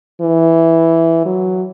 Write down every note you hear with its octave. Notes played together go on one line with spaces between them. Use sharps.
E3
F#3